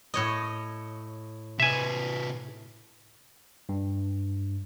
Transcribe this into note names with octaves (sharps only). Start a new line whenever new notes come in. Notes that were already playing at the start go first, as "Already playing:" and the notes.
A2 C#5 D#5
C3 B4 E5 G#5
G2